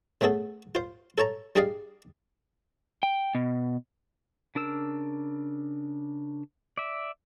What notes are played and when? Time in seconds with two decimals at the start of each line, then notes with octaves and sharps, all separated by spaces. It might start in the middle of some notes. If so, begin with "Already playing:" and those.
0.21 C#3 A3 B3 G#4 A4
0.75 F4 C5
1.18 A4 C#5 A5 A#5
1.56 G3 D4 G#4 D5 D#5 F5
3.03 G5
3.35 B2
4.55 C#3 D4 A#4 E6
6.78 D5 E5